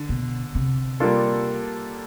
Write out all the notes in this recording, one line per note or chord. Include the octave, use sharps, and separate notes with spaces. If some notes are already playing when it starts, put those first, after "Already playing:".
Already playing: D3
B2
C3
G3 A#3 D4 F4 A4